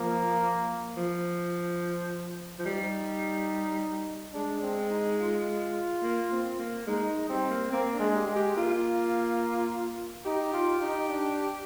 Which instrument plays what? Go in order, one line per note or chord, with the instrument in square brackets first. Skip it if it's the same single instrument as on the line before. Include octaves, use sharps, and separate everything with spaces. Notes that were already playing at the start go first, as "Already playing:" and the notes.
Already playing: [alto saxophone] F3 [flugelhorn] A#3
[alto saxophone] F3
F3
[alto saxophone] G3 [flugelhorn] D#4
[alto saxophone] G#3 [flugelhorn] D4
[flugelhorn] C4
D#4
F4
[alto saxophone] A#3
C4
A#3
[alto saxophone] G#3 [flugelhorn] D#4
[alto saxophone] G3 [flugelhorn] C4
[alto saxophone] A#3
[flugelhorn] A#3 [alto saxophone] C4
[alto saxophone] D4
[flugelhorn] G#3
[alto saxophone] G4
[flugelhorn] G#3
[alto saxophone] G4
[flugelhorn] A#3 [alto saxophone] F4
[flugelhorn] D#4 [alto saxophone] G4
[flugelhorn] F4
D#4
D4